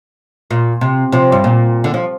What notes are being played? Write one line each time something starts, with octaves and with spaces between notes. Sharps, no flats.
A#2
C3
C3 F3
G2
A#2
D3
F3